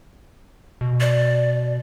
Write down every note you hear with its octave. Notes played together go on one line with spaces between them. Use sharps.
B2
D5